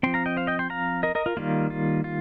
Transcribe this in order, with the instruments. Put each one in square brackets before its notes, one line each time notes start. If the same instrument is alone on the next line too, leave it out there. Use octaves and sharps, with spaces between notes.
[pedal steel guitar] F3 C4 G5 C6
F5 A#5
D#5 G5
C5 F5
D#5 G5
G5 C6
F5 A#5
A#4 D#5
A#4 D#5
F4 A#4
D#3 G3 A#3 F4
F4
F4